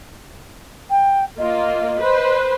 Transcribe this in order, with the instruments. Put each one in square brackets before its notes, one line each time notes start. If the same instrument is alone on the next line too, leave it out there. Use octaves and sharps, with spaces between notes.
[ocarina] G5
[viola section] A#3 F4 [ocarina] D#5
[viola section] B4 C5